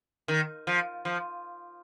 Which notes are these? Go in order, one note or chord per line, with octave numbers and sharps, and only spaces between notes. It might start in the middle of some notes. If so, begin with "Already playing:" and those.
D#3
F3
F3